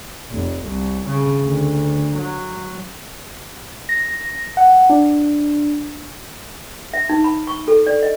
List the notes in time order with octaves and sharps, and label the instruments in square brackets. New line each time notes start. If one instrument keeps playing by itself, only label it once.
[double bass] F1
C2
C#3
D2
F#3
[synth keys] A#6
F#5
D4
[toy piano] E5
D#4
B5
C#6
A4
D5
D#5